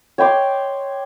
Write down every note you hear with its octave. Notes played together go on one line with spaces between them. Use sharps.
C#5 G5 C6 D6